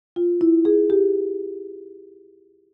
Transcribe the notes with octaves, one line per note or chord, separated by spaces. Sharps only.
F4
E4
G#4
G4